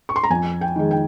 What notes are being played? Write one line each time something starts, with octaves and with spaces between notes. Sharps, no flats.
C#6
C6
A#5
F2 G#5
G5
D#3 G#3
G5